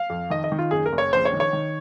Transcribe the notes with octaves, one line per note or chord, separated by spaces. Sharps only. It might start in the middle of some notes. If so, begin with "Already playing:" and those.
Already playing: F5
F2
D#3 D#5
D#5
D#3
F4
F#1 G#4
A#4
F#1
C#5
A#1 C5
C#5
D#3
C#5
D#3